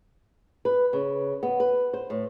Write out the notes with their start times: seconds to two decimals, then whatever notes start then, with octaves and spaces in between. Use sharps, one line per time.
0.65 B4
0.93 C#3
1.43 B3
1.60 B4
1.93 C5
2.10 A2